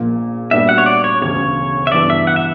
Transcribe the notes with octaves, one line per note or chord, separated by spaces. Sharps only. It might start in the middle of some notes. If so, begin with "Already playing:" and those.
Already playing: A#1 A#2 A#3
A#2 G3 B3 D4 F#4 E5
F#5
C#5
D5
C#5
E1 D2 C#3 C#5
E5
G2 E3 B3 D5
E5
F#5
E5